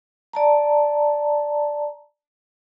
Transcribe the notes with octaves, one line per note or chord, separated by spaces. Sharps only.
D5 A5 A#5